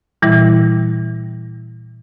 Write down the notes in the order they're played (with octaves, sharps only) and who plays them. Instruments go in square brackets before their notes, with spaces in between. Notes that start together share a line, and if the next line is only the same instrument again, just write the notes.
[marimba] A#2 E3 G3 E4